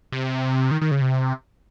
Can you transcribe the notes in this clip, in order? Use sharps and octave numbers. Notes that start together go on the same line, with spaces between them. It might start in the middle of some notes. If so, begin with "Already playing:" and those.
C3
D#3
D#3
C#3
C3